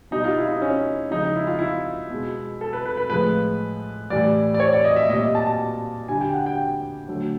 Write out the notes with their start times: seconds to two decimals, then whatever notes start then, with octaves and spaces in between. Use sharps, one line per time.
0.11 B2 G3 D#4
0.24 F4
0.37 E4
0.49 D#4
0.62 C#4
1.11 C#3 F3 G#3 D#4
1.36 E4
1.47 F4
1.59 E4
2.10 B2 G#3
2.61 A4
2.73 B4
2.85 B4
2.97 B4
3.10 A2 F3 G#3 B4
4.10 A2 E3 G3 D5
4.54 D5
4.60 C#5
4.73 D5
4.84 D#5
4.96 E5
5.09 A#2 G3 D#5
5.35 A5
5.47 A5
6.08 D3 G3 G#5
6.21 G5
6.34 F#5
6.46 G5
7.08 D3 F#3 A3